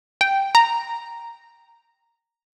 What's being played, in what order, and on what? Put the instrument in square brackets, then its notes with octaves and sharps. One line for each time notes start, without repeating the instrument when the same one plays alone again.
[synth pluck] G5
A#5